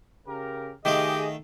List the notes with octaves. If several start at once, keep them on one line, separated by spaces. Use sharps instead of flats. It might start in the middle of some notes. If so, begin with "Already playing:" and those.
C#3 G4 A#4
D#3 A3 G4 G#4 D#5 F5